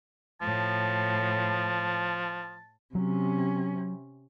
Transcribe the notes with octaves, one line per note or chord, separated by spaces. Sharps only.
A2 F3 A5
C3 F#3 C#4